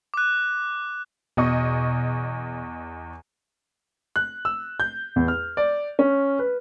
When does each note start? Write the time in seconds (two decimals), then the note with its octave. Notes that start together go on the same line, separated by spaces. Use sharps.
0.14 D6 F#6
1.37 E2 B2 D#5 C#6
4.16 F#6
4.45 E6
4.80 G6
5.16 E2
5.28 F6
5.57 D5
5.99 C#4
6.39 B4